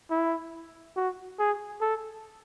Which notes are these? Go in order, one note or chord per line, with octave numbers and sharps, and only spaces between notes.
E4
F#4
G#4
A4